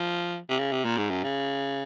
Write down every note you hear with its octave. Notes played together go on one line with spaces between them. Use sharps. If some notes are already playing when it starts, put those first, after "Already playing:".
Already playing: F3
C3
C#3
C3
A#2
G#2
F#2
C#3